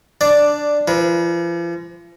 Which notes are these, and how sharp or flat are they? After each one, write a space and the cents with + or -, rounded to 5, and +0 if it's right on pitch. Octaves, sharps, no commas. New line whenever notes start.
D4 +5 D5 +0
F3 -40 B4 -30